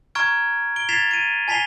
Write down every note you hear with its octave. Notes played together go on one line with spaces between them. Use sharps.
A#5 C#6 F6 G#6 D7
D7 G7
G#6 A6 B6 C7 E7 F7
D7 D#7
G#5 A5 B6 C7 F7 G7